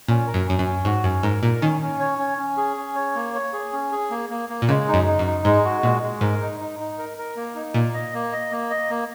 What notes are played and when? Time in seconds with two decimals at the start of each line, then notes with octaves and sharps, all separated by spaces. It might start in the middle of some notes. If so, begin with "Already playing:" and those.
0.08 A#2 C#4
0.27 A#4
0.34 F#2
0.46 F#2 C#4
0.59 F#2
0.65 C#4
0.85 G#2 F#4
1.04 F#2 C#4
1.23 G#2 A#4
1.43 A#2 A#4
1.62 D#3 C#4
1.81 C#4
2.00 C#5
2.19 C#4
2.38 C#4
2.57 G#4
2.77 C#4
2.95 C#5
3.15 A#3
3.34 C#5
3.53 G#4
3.72 C#4
3.92 G#4
4.11 A#3
4.30 A#3
4.49 A#3
4.62 A#2
4.68 C#3 G#3
4.88 D#4
4.94 F#2
5.06 D#4
5.19 F#2
5.26 D#4
5.45 G#2 G#3
5.65 F#4
5.83 A#2 G#3
6.02 G#3
6.21 G#2 A#4
6.41 D#4
6.60 D#4
6.80 D#4
6.98 A#4
7.18 A#4
7.36 A#3
7.55 D#4
7.74 A#2 A#3
7.94 D#5
8.14 A#3
8.32 D#5
8.51 A#3
8.70 D#5
8.90 A#3